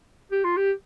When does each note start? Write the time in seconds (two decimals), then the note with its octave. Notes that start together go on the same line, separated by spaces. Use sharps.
0.32 G4
0.44 F4
0.57 G4